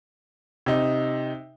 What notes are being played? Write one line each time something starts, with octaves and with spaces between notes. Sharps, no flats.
C3 D#4